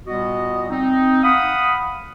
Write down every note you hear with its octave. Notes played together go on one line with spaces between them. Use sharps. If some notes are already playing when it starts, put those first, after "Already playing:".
A#2 G3 B3 F#4 D#5
C4 D#4
F5 F#5 B5 D#6